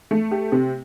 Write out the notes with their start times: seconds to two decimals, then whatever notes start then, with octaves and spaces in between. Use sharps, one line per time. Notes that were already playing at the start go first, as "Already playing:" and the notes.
0.11 A3
0.31 G4
0.52 C3